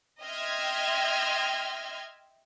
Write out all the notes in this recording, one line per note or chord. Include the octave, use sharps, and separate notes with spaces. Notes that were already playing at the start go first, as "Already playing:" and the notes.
D#5 E5 G5 C6 F6 G#6